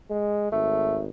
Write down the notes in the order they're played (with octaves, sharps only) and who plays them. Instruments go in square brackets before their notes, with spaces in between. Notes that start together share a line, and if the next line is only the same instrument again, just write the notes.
[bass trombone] G#3
[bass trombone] G#1 [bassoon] A3